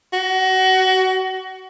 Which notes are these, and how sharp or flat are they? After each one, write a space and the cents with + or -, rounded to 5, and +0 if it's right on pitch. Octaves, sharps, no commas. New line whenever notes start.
F#4 +25